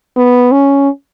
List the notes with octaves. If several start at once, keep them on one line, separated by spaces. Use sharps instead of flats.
B3
C#4